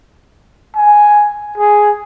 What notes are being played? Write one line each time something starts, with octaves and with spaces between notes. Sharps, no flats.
G#5
G#4